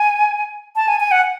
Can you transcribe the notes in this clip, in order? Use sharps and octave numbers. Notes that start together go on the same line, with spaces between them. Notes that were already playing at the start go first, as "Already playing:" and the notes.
Already playing: G#5
A5
G#5
G#5
F#5